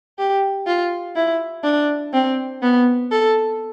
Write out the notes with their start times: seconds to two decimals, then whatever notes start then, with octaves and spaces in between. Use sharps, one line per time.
0.19 G4
0.67 F4
1.16 E4
1.64 D4
2.13 C4
2.62 B3
3.11 A4